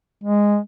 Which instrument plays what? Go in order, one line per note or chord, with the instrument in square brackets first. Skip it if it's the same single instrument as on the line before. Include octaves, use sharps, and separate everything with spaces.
[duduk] G#3